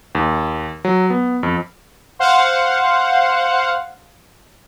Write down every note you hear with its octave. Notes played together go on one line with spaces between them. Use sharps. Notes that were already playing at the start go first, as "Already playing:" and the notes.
D#2
F#3
B3
F2
C5 F5 F#5